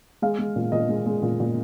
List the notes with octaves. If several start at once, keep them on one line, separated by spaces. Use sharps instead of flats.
G#3 F5
G#3
A#2
A#2 D#5
G#3
G#3
A#2
A#2